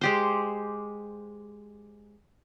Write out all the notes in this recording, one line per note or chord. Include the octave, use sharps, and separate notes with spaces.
G#3 G4 C5